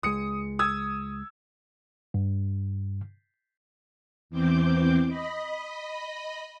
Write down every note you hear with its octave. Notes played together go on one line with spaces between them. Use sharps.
C#2 G#3 D#6 C#7
D#6 E6 G#6
G2
E2 E3 C4 D6 G6
D#5 B5